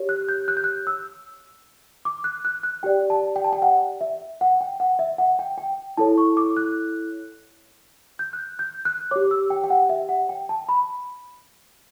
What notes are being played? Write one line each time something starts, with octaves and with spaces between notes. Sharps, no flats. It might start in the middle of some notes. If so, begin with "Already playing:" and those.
Already playing: G4 C#5
F#6
G6
F#6
G6
F#6
E6
D6
F#6
F#6
F#6
G4 D5 G5
A5
G5
A5
G5
F#5
E5
F#5
G5
F#5
E5
F#5
G5
G5
E4 A4 C#5 A5
C#6
D6
F#6
G6
F#6
G6
F#6
G4 C#5 D6
E6
G5
G5
F#5
E5
F#5
G5
A5
B5